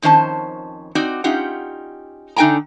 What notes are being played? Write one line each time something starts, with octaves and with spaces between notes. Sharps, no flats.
F2 D#3 C#4 C5 A5
C4 D#4 F#4 D5
C#4 D#4 F4 G4 F#5
D3 D#4 A#4 G5 G#5 A#5